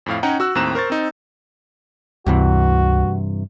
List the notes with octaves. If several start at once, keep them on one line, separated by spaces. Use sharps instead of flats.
F2 A2 F5
C#4 D#4 C#5 F#5 G5 A#5
F#4 E6 F#6
D#2 A2 C4 A#5 F#6 E7
A#4 C5 C#6 A6
C4 D#4
C#2 G2 C3 E3 F#4